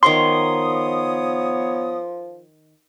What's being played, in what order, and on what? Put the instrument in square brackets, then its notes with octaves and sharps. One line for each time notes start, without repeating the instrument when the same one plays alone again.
[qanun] D#3 A#4 C#6 [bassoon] F3 [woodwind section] B3 C#5 D#6 [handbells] C6